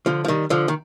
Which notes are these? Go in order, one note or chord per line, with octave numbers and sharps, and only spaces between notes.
D3 F3
F3
D#3 G3
D3 F3
D#3